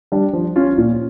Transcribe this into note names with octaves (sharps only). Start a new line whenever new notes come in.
G3 D4
F3
C#4 F4
A#2